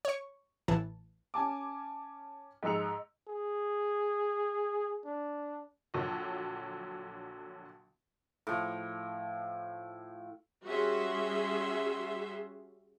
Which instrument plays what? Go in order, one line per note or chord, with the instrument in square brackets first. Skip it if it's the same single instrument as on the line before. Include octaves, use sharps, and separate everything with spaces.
[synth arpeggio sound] C#5 C#6
A1 A2 E3 A5
[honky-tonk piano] C#4 G#5 A5 D6
G#2 F3 G#3 E6 C#7 F7
[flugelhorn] G#4
D4
[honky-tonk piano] A#1 D3 F#3
[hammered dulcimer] A2 F3
[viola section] G3 C#4 F#4 G#4 E5 C6